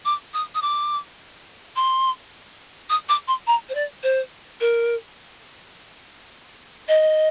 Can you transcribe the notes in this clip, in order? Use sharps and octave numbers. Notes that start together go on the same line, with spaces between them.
D6
D#6
D#6
D6
C6
D#6
D6
C6
A#5
C5
D5
C5
A#4
D#5